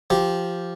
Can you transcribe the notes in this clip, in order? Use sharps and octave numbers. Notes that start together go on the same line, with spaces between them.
F3 G4